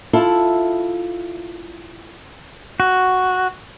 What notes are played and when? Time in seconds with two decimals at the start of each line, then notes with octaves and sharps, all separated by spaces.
0.13 E4 F4 A4
2.80 F#4